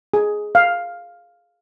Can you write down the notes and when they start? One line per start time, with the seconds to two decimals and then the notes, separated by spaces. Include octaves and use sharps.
0.14 G#4
0.55 F5